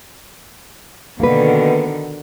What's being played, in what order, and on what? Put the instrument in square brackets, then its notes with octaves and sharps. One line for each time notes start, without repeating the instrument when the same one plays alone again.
[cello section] B2 D3 D#3 [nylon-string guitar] A#3 B4